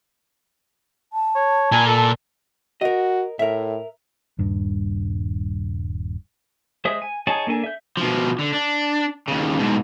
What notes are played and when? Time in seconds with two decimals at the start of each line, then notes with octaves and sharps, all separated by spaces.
1.13 A5
1.35 C#5
1.72 A#2 G#5
1.87 A4
2.81 F#4 A#4 D#5
3.39 A2 A#4 E5
4.39 D#1 G2
6.85 G#3 C5 E5 D#6
7.02 G#5
7.27 D#4 G#4 C#5 G#5 A5
7.47 A#3 D4 A4 G#5
7.64 E5 G6
7.97 B2 F3
8.39 D3
8.53 D4
9.28 D#2 C#3
9.59 G#2 B2